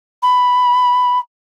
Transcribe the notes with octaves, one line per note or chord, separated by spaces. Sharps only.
B5